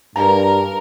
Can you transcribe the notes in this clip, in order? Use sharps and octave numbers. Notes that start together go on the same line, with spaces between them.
G2 A#4 A#5